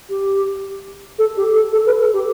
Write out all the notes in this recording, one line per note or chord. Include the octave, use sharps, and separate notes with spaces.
G4
A4
G4
A4
A4
B4
A4
G4